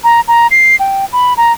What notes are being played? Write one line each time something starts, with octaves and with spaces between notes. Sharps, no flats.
A#5
A#5
C7
G5
B5
A#5